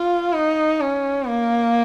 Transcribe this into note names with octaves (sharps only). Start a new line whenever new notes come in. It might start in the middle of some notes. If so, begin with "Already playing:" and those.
Already playing: F4
D#4
C#4
A#3